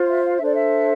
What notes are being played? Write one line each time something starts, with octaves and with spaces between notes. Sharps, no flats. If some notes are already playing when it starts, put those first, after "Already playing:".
Already playing: F4 C5
E5
F5
E5
D4 A4 C5 D5
E5